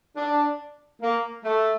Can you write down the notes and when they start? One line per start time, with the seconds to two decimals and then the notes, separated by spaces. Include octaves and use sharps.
0.16 D4
1.02 A#3
1.44 A3